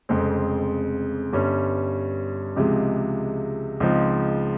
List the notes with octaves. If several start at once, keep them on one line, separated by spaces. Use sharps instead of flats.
F1 F2 C#3 G#3 C4
G1 G2 G3 C#4
C#2 C3 F3 G#3
C#2 C#3 F3 C4 D#4